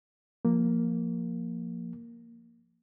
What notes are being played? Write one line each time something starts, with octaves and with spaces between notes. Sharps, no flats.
F3 A#3